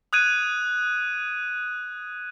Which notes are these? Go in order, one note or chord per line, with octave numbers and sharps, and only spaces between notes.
D#6 F#6 G#6 D#7